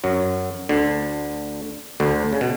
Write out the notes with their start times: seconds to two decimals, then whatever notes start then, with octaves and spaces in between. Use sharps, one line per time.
0.04 F#2 F#3
0.69 D2 D3
2.00 D2 D3
2.33 C#3
2.41 B2